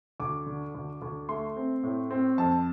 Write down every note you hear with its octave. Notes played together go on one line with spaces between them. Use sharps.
D2 D6
D3
D2
D2
A3 C6
C4
A2
C4
F2 A5